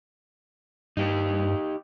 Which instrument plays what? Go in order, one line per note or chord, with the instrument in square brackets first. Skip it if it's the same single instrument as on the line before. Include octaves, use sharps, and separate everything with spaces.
[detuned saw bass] G2 [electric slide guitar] D#4 G4